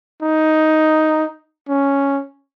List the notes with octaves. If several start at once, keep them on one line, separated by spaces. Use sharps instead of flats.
D#4
C#4